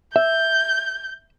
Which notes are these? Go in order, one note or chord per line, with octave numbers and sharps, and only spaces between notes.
E5 G6